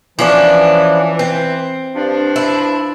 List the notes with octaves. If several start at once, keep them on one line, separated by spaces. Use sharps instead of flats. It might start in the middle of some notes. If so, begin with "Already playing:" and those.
E3 F3 C#4 D4
C4
G2 F3 D4
E4